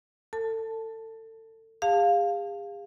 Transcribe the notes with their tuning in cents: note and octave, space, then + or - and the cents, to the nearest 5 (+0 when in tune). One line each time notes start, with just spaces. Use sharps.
A4 +30 A5 +0
G#4 -45 F5 +0 A5 +15